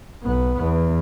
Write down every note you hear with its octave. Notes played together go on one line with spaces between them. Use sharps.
B1 B3
E2